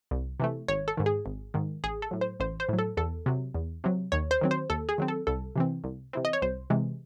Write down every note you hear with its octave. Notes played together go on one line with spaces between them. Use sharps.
C2
C3 E3 A3
G#1 C#5
A4
G#2 D#3
G#4
G#1
G#2 D#3
A1 G#4
A4
A2 F#3
C5
A1 C5
C5
A2 F#3
A4
E2 A4
C3 F#3
E2
C3 F#3
D#2 C#5
C5
D#3 F#3 C4
C5
D#2 A4
G#4
D#3 F#3 C4
A4
C2 A4
C3 E3 C4
C2
C3 E3 C4
D#5
C#5
C2 C5
C3 E3 G#3